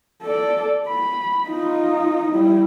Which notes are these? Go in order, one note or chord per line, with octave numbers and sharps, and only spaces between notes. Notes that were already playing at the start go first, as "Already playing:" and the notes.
A4 D5
B5
D#4 F4
G3 E4